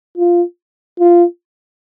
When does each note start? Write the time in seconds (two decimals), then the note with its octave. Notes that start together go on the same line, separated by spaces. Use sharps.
0.17 F4
0.99 F4